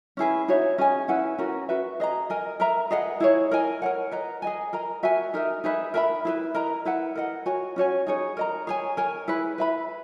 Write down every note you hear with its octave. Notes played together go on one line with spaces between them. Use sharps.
C#4 E4 G#4 B4
D#4 F#4 C#5 E5
C#4 G#4 D#5 G#5
C#4 E4 B4 F#5
C#4 F#4 A#4
F#4 B4 E5
G#4 D#5 A#5
A#4 D#5 G#5
A#4 E5 A#5
G#4 B4 D#5 F#5
E4 G#4 C#5
A#4 D#5 G#5
A#4 C#5 F#5
B4 D#5 A#5
G#4 D#5 G#5
A#4 D#5 A#5
F#4 A#4 E5 G#5
D#4 A#4 E5
D#4 G#4 B4 E5
A#4 E5 G#5 B5
E4 G#4 B4
A#4 D#5 A#5
E4 B4 F#5
A#4 D#5 F#5
F#4 C#5 G#5
C#4 F#4 C#5 G#5
D#4 G#4 C#5
A#4 D#5 A#5
G#4 C#5 G#5
A#4 C#5 G#5
E4 G#4 B4
B4 E5 B5